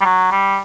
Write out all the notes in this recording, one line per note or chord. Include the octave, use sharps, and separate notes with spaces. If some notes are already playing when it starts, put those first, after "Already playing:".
G3
F#3
G3